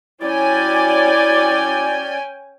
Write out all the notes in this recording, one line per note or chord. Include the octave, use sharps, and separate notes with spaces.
F#3 C#4 E4 D5 G5 G#5